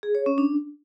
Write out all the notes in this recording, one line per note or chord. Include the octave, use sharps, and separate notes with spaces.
G#4
C#5
C#4
D4